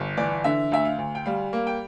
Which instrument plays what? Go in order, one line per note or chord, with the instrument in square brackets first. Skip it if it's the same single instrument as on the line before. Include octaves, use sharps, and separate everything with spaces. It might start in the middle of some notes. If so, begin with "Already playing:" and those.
Already playing: [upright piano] G1
E3 D5
D3 E5
D2 E5
F5
D2
G5
G3 F5
A#3
G5